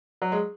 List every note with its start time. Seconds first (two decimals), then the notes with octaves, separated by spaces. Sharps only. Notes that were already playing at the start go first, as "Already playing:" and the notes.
0.22 F#3
0.32 G#3